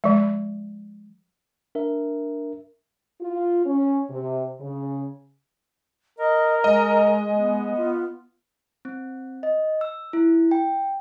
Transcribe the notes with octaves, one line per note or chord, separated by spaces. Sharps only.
F3 G#3
D4 A#4 E5
F4
C#4
C3
C#3
A#4 D#5
G#3 D#5
B3
F4
C4
D#5
E6
E4
G5